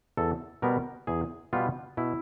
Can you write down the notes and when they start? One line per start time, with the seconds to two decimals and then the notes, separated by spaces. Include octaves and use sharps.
0.17 E2 A4
0.62 B2 G3 B3 A#4
1.07 E2 G#4
1.53 B2 G3 B3 F4
1.97 B2 E4